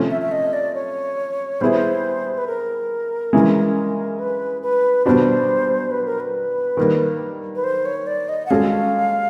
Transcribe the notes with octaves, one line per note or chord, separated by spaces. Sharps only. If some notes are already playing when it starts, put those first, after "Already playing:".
Already playing: C3 F3 A3 C#4
E5
E5
D#5
D5
C#5
G3 B3 E4 G#4 C5
B4
A#4
C#3 E3 G#3
B4
B4
B2 G3 B3 D4 F#4 C5
B4
A#4
B4
D#3 G3 A#3
B4
C5
C#5
D5
D#5
F#5
G#3 C#4 F#4 A4 F5